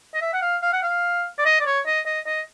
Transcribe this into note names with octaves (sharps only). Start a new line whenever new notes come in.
D#5
E5
F#5
F5
F5
F#5
F5
D5
D#5
D5
C#5
D#5
D#5
D#5